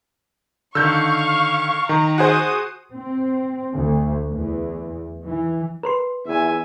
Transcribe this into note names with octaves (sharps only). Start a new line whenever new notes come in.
D3 D#3 F5 C#6 E6 G6
D#3 A#5
F#4 G#4 C5 D#6
C4
D2
E2
E3
A#4 B4 C6
E2 E5 G#5